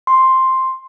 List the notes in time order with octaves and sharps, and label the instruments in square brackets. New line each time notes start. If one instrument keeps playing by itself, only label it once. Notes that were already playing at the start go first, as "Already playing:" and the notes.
[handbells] C6